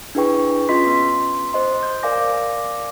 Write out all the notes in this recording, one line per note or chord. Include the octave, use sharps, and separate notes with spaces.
D4 E4 G#4 B4 G5 C#6
C#4 F4 D#5 C6 B6
B3 C6
C5 D#5 C6
G6
A#4 D5 F5 G#5 D6 A#6